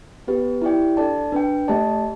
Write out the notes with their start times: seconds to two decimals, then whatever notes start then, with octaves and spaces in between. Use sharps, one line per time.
0.27 B3 G4 B4
0.62 E4 G4 D5 G5
0.97 D4 A4 D5 A5
1.32 D4 B4 G5
1.68 A3 G4 D5 A5